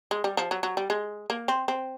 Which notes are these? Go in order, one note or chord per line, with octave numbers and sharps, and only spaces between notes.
G#3
G3
F3
F#3
F#3
G3
G#3
A#3
C4
C4